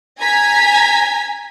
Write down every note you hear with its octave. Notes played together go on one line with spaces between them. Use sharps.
G#5 A#5 G#6 B6